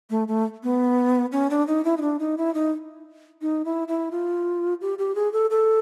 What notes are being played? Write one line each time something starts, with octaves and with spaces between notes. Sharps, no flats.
A3
A3
B3
C#4
D4
D#4
E4
D#4
D4
D#4
E4
D#4
D#4
E4
E4
F4
G4
G4
G#4
A4
A4